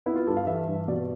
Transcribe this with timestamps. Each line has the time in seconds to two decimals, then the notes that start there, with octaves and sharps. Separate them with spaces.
0.06 B3 E4
0.16 F4
0.27 G2 A4
0.37 F5
0.47 E3 E5
0.68 G2
0.88 B2 D5